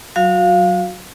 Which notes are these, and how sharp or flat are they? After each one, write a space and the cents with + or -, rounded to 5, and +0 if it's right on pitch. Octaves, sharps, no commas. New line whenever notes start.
F#3 +5 F#4 -35 F5 +0